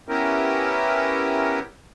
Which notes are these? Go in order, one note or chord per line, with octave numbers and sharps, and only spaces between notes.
B3 C#4 E4 G4 A#4